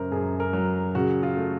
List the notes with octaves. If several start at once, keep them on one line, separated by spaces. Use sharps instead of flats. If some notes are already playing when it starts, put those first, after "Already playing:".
Already playing: F#2 C#3 A#4 C5
F#2 G#4
A#4
F#3
C#3 F#4
F4
A3